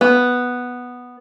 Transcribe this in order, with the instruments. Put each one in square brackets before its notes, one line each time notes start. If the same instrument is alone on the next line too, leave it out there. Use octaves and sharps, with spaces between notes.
[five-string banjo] B3